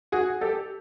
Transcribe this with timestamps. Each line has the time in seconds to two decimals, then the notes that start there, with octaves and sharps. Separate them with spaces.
0.12 F#4 G#4
0.41 G4 A4